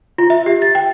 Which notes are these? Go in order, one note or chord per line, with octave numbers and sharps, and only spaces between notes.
F4
E5
G4
A6
G5